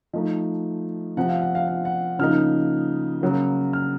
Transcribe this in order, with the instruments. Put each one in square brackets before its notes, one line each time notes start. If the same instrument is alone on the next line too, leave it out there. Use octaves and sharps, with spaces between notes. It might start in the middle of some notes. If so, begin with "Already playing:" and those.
[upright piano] F3 A3 D#4 D#5
C3 F3 C4 F#5
F5
F#5
F5
F5
F#5
C#3 F3 A#3 D#4 F6
C#3 F#3 A#3
F6